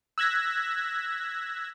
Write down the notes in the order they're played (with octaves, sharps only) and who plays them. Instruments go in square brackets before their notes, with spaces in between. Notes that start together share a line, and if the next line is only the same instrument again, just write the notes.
[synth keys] E6 F#6 G#6 A#6 B6